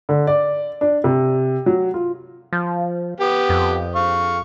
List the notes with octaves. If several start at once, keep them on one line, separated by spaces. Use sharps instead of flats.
D3
D5
D4
C3
F#3
F4
F3
B3 G4
F2
F5 C#6